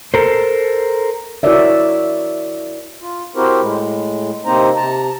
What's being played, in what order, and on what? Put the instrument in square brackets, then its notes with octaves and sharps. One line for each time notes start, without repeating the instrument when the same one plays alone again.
[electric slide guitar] A4 A#4 C5
[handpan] E4 F#4 A#4 C#5 D5 E5
[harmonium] F4
C4 E4 F#4 G4 A#4 C5
A2 G#3
C3 A#3 C4 D#4 C5 A#5
C3 A5 A#5